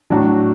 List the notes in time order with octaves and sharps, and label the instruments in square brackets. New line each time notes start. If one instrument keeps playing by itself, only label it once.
[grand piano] A2 F#3 D4 F#4